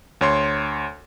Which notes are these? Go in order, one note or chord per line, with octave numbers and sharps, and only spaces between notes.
D2 C#5 C6